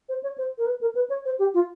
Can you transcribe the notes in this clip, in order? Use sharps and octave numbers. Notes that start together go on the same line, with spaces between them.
C5
C#5
C5
A#4
B4
A#4
B4
C#5
C5
G4
F4